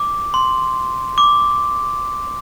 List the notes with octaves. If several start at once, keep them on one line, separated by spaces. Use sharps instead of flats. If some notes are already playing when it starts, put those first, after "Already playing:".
Already playing: D6
C6
D6